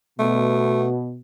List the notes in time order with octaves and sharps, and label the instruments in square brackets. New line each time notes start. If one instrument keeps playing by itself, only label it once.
[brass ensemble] B2 [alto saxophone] A3